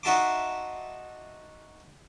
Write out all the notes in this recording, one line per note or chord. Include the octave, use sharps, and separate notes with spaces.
D#4 F#4 E5 A5 C6 D6